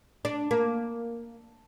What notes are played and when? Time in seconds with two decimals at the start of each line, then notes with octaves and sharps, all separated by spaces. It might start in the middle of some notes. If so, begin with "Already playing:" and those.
0.25 D4
0.51 A#3